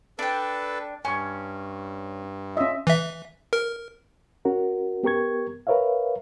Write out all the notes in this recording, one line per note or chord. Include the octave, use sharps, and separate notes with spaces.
D4 A4 B4 G5
G2 C#4 G#5 C#6
C#4 F4 D#5 E5
E3 E5
A#4
C#4 F#4 A#4
B3 G4 A#4 C#6 G#6
A#4 B4 C#5 E5 F5